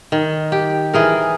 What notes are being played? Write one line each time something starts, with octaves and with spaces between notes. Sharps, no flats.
D#3
G4
E3 G#4 A#4